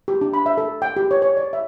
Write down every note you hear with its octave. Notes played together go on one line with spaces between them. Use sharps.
G4
D4
B5
E5
A4
G5
G4
C#5
C#5
D5
E5